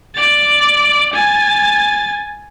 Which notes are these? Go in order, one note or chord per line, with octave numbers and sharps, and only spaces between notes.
D5 A6
G#5 A6